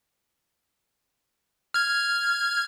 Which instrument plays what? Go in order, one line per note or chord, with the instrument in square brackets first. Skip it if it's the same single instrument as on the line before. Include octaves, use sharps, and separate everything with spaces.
[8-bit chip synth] F6 G#6